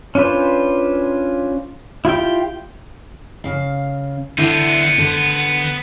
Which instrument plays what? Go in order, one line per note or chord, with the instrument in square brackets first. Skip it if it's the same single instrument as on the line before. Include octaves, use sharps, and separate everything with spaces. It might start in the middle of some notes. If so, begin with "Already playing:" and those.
[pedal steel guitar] C#4 D4 F4 B4 C5
E4 F4 G4 G5
[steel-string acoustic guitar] C#3 F5
[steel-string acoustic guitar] D3 D4 E4 [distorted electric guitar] B3 C5
[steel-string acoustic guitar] D3